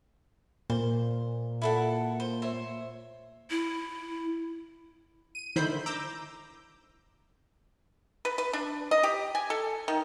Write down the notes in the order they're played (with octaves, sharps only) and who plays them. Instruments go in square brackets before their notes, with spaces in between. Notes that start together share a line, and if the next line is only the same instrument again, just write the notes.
[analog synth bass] A#2 [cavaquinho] C5
[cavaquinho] E4 A4 F#5
C5
C5 C#5 E5
[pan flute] E4
[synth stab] D#7
D3 D#3 E4 C5 B5 G6
A#5 D6 E6 G6
[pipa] B4
B4
D4
D#5
G4
G#5
A4
D#3